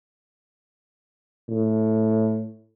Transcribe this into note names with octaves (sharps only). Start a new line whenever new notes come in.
A2